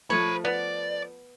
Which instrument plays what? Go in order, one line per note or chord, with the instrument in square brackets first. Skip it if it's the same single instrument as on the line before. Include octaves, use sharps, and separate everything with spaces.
[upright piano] F3 A3 [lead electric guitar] C5 B5 [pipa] C#5
[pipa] B3 [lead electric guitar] D5